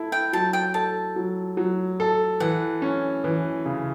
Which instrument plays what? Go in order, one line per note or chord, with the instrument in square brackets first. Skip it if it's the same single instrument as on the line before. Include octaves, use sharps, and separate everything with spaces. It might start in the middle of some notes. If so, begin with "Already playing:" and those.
Already playing: [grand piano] E4 A4
[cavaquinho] G5
[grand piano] F#3 [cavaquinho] A5
[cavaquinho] G5
[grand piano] A4 [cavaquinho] A5
[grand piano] F#3
F#3
A4
[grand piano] E3 [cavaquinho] F#5
[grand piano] C#4
E3
C#3